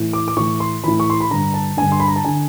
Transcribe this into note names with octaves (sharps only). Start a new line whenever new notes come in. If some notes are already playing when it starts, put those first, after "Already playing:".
Already playing: A2 E3
D6
D6
A2 E3 C#6
C6
A2 E3 B5
C#6
C6
B5
G2 D3 A#5
A5
G2 D3 G#5
C6
B5
A#5
A5
D3 G#5